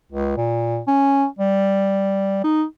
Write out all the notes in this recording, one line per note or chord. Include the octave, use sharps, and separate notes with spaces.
C#2
A#2
C#4
G3
D#4